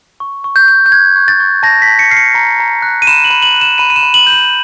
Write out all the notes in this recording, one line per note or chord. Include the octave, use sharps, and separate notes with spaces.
C#6
C#6
G6
G6
G6
F#6 G#6
C#6
A6
C#6
A5 A#6
B6
A5
C#7
F6 C7
C#7
A#5
A#5
F#6
D#7
B5 E7
F#7
B5
F#7
F#6
E7
B5 D#7
D#7
E7
B5
F#7
G6
F#7